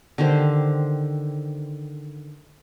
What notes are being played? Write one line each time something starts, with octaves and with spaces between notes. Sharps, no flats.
D3 D#3 G4 C5